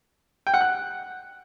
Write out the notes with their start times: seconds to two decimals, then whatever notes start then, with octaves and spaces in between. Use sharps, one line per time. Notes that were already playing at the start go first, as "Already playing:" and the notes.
0.47 G5
0.54 F#5
0.61 F#6